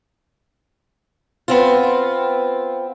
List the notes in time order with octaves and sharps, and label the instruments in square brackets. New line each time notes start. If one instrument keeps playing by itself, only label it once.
[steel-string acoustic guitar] B3 C4 F4